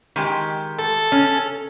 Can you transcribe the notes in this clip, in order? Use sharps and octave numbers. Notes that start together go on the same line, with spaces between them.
D#3 G#3 G4
A4
C#4